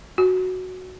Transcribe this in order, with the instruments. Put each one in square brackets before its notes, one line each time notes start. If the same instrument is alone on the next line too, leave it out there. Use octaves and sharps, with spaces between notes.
[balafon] F#4